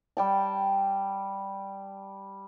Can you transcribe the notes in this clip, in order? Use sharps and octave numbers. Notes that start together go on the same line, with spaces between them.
G3 G5 A5